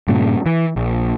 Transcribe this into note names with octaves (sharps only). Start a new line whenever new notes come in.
G2 A#2 C#3
E3
A#1